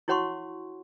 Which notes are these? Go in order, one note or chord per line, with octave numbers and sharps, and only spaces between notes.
E4 F#4 C#5 F#5 C6 C#6